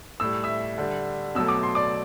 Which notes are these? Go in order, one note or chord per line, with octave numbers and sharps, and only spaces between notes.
A2 G3 E6
E5 E6
D3 G3
B2 F#3 A3 E6
D6
C6
D5 D6